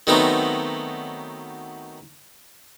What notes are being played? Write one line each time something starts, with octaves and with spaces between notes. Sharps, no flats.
D#3 F#3 A3 B3 C4 D#4